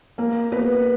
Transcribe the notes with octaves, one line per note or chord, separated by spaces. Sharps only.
A#3 A#4
B3 B4